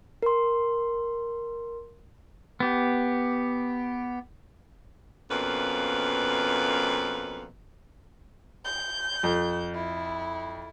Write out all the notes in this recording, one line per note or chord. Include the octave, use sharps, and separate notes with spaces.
A#4 C6
B3 G4
F2 B2 A#3 C#4 B4
G6
F2
E4